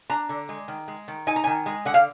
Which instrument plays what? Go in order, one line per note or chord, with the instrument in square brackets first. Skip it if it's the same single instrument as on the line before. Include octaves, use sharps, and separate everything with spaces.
[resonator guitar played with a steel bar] D4 A#5
D3
G#3
D#3
G#3
D#3
D#4 G#5
A#5
D#3 G#5
G#3
D3 F#5
F5